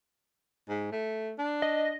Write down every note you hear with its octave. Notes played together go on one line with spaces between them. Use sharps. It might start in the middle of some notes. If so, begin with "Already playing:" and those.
G#2
A3
D4
D#5